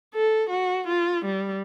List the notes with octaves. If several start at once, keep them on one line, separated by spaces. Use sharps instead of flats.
A4
F#4
F4
G3